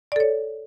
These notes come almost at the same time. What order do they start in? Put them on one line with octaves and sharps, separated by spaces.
D5 A4 C#5